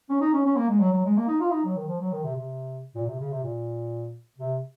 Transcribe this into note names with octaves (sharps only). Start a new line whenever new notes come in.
C#4
D#4
C#4
C#4
A#3
G#3
F#3
F#3
G#3
A#3
D#4
F4
D#4
F#3
D#3
F3
F#3
D#3
C3
C3
A#2
C3
C#3
C3
A#2
C3